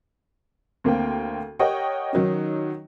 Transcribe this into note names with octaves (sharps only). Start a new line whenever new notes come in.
D2 A#3 C4 G5
G4 A#4 C#5 D#5 F#5 G5
D#3 F#3 C#4 D#4